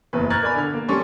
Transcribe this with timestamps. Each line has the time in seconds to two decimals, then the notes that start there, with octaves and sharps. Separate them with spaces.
0.13 F#1 E2 B4
0.30 A#5 C#6 F6 F#6 G#6 A6
0.42 A#4 D5 G#5 B5
0.55 D3 F6
0.74 A#3
0.88 G3 C#4 A4 D5 C6 C#6